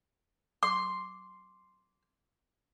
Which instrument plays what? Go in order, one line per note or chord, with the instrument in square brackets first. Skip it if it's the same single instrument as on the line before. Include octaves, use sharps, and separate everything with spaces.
[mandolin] C6 [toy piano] D6